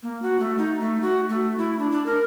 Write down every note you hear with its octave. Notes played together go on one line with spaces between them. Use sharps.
A#3
F#4
A3
D#4
A3
F#4
A3
E4
D4
D4
A#4